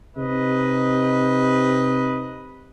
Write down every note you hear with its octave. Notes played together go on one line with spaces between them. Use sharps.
C3 D#4 B4 D#5